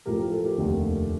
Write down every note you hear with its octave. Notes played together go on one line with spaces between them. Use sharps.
A1 A2 F3 A3 G4 A#4
A4
G4 A#4
F1 D#2 D3 A3